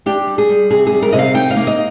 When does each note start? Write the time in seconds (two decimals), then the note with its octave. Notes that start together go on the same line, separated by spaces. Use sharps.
0.06 D4 G4
0.27 G3
0.38 G#4
0.49 G3
0.70 C3 G#4
0.87 G#4
0.92 G3
1.02 A#4
1.12 C3 D#5
1.19 F5
1.34 D#4 G5
1.51 F5
1.56 A#3
1.67 D#5